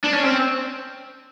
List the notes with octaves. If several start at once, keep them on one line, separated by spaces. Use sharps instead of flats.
D4
C#4
C4